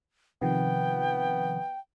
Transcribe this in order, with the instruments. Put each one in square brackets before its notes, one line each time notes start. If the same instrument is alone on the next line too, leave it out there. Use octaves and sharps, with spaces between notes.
[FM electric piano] C3 D#3 F3 [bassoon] B3 [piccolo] G5